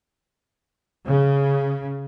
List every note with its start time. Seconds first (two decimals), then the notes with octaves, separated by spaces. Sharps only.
1.05 C#3